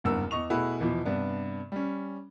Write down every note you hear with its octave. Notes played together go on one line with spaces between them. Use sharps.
F#1 E2 G2 A#4 F#5 E6
E2 D#5 C#6 F7
B2 A3 E4 F#4 G#4 B4
E2 B2 E3 F3
G2 C3 B3 D4
G3 C#4